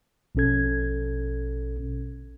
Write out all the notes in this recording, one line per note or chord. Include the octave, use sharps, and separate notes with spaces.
A#1 B2 C#4 A4 G#6